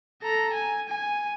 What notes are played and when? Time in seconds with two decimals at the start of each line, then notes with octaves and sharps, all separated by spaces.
0.22 A4 A#5
0.53 G#5
0.88 G#5